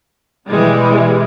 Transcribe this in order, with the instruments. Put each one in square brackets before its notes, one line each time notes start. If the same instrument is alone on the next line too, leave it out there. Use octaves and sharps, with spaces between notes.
[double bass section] B2 E3 [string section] G3 G#3